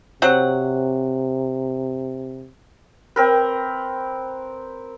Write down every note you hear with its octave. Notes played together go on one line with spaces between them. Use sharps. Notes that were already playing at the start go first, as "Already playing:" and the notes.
C3 F#3 C4 F#5
C4 A#4 B4